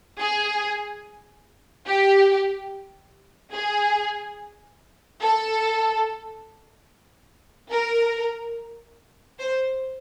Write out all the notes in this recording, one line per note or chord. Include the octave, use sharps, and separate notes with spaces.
G#4
G4
G#4
A4
A#4
C5